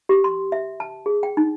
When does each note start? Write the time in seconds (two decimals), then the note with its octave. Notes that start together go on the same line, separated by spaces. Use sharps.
0.09 G4
0.24 C6
0.52 E5
0.80 A5
1.06 G#4
1.23 G5
1.37 D#4